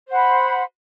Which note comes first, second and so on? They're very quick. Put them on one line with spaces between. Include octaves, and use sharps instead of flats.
C5 F#5 B5